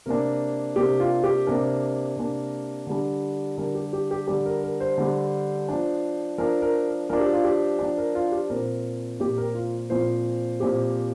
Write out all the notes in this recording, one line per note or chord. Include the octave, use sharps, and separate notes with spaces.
C3 A#3 D4 A#4
C3 A#3 D4 G4
F4
G4
C3 A#3 D4 A#4
C3 A#3 D4
D3 G3 D4
D3 G3 D4 A#4
G4
G4
G4
D3 G3 D4 G4
A#4
A#4
C5
D3 G3 D4
F3 D4
F3 D4 A#4
A#4
F3 D4 A#4
G4
F4
G4
F3 D4
A#4
F4
G4
A#2 F3 C4 A#4
A#2 F3 C4 G4
A#4
F4
A#2 F3 C4 C5
A#2 F3 C4 G4